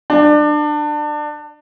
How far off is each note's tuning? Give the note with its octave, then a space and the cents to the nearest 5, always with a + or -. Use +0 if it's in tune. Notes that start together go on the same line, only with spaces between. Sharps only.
D4 +25